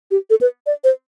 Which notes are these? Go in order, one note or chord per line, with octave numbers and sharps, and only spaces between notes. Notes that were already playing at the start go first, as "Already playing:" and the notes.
G4
A4
B4
D5
C5